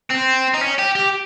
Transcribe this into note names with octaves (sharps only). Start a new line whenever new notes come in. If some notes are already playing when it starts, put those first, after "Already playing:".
C4
D#4
C#4
G4
G4